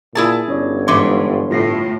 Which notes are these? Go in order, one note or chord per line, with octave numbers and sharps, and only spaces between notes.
A#2 E4 G#4 A5
G1 C#4 C#5 D5
G#2 E3 C#4 C#5 C6
A2 F4 A#6 C7